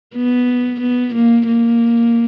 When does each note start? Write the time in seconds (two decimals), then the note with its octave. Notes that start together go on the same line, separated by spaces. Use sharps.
0.16 B3
0.81 B3
1.15 A#3
1.47 A#3